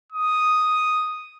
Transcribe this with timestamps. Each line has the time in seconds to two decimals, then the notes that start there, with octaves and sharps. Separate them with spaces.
0.12 D#6